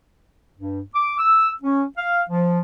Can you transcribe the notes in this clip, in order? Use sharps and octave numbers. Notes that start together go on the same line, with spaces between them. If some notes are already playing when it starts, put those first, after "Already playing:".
G2
D6
E6
C#4
F5
F3